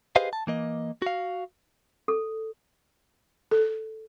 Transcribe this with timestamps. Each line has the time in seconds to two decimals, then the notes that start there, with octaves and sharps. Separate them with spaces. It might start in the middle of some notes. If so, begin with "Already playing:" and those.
0.16 G4 G#4 B4 C5 D#5 F5
0.33 A5
0.47 E3 A#3 D#5
1.02 F#4 F5
2.08 A4
3.51 A4